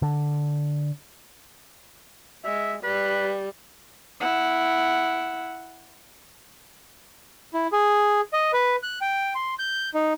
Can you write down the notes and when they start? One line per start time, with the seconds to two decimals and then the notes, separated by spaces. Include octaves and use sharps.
0.02 D3
2.45 G#3 E5
2.84 G3 B4
4.21 E4 F#5
7.54 E4
7.72 G#4
8.33 D#5
8.53 B4
8.83 F#6
9.01 G5
9.35 C6
9.59 G6
9.94 D#4